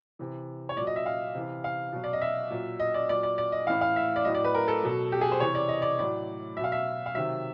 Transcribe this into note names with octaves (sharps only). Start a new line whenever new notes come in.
C3 E3
C#5
A#2 F#3 D5
D#5
E5
F5
C3 E3
F5
B2 F#3
D5
D#5
E5
A#2 F#3
D#5
D5
A#2 F#3 D5
D5
D5
D#5
A2 E3 F5
F5
E5
D5
A2 F#3 D#5
D5
B4
A#4
A4
B2 F#3
G4
G#4
C5
C3 E3 C#5
D5
D#5
D5
A2 F#3 D5
B2 F#3 E5 F5
E5
F5
C3 D#3 F#3 E5